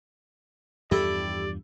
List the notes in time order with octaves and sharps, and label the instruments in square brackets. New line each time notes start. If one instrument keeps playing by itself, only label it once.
[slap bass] E2 G2 F3 [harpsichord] E4 A4 [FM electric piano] G4 [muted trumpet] D5